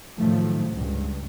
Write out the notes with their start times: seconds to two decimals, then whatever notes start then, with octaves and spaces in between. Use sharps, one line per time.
0.19 A2 D#3 F3 F#3 A3
0.71 C#2 G2